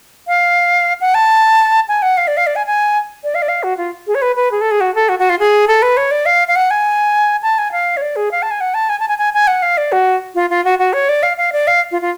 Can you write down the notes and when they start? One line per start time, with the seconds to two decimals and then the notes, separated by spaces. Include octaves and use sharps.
0.28 F5
1.01 F#5
1.14 A5
1.88 G#5
2.02 F#5
2.17 F5
2.28 D5
2.37 F5
2.47 D5
2.56 G#5
2.67 G#5
3.24 D5
3.35 F5
3.42 D5
3.49 F5
3.63 F#4
3.77 F4
4.07 G#4
4.15 C#5
4.22 B4
4.36 B4
4.51 G#4
4.61 A4
4.71 G#4
4.81 F#4
4.95 A4
5.09 F#4
5.19 F#4
5.30 F4
5.39 G#4
5.68 A4
5.82 B4
5.97 C#5
6.11 D5
6.26 F5
6.48 F5
6.56 F#5
6.71 G#5
7.43 A5
7.58 G#5
7.72 F5
7.97 C#5
8.02 D5
8.16 G#4
8.31 F5
8.42 A5
8.51 G#5
8.61 F#5
8.74 A5
8.89 G#5
9.00 A5
9.08 G#5
9.18 G#5
9.34 G#5
9.47 F#5
9.62 F5
9.77 D5
9.92 F#4
10.35 F4
10.50 F4
10.65 F#4
10.79 F#4
10.93 C#5
11.09 D5
11.23 F5
11.37 F5
11.53 D5
11.67 F5
11.91 F4
12.02 F4